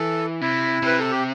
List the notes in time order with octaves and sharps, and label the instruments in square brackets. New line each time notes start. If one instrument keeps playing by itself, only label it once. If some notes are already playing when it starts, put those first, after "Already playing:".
Already playing: [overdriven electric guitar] E3 [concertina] A4
[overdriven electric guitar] C3 [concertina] E4
[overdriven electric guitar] C3 [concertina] B4
[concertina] A4
G4